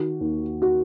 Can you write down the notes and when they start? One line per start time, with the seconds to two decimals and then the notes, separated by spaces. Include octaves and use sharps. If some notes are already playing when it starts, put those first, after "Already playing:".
Already playing: D#3 F#4
0.21 D#2
0.62 F#4